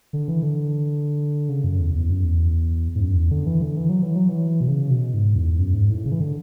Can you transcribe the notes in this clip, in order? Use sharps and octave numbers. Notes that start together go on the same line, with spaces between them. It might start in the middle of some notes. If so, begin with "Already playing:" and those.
D3
E3
D3
C#3
F#2
E2
E2
F#2
E2
G#2
F#2
E2
D3
E3
D3
E3
F#3
E3
F#3
E3
B2
C#3
B2
G#2
E2
F#2
G#2
A2
C#3
E3
D3